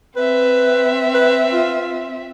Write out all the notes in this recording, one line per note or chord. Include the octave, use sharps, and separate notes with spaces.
C4 B4 E5
B4
F4